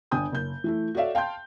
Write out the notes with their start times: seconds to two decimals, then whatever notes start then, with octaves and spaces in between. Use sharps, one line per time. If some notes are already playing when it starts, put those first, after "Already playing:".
0.11 G1 D4 G5 G#5 D#6 G6
0.32 F#1 G6
0.64 E3 A3 E4
0.95 F#4 A4 C#5 D5 E5 F5
1.15 F5 G5 A5 C6 G6